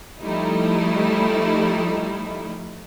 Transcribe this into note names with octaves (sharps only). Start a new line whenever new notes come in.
F3 G3 A3 D#4 E4